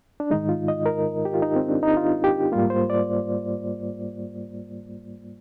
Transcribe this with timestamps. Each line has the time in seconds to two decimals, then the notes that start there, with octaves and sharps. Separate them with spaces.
0.20 D4
0.30 G#2 D#3 G#3 D#4
0.49 F4
0.68 D#5
0.86 A#4
1.25 G4
1.34 F4
1.42 D#4
1.56 C4
1.69 D4
1.83 D#4
1.97 F4
2.24 G4
2.52 G#2 G3 A#3 F4
2.70 C5
2.90 D5